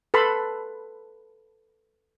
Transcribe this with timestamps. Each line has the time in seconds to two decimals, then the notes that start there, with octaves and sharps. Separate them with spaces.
0.14 A4 B4 A5 B5 C6